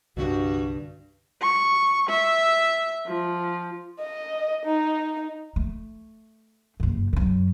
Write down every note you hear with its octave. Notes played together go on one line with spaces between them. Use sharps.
C2 G2 D3 D4 F#4
C#6
E5
F3
D#5
D#4
A3
F#1 G2
F#2 C#3